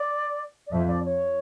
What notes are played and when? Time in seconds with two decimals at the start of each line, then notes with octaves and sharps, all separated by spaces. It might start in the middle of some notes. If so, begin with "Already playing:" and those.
Already playing: D5
0.67 D5
0.71 F2 E5
0.88 D5
1.05 C#5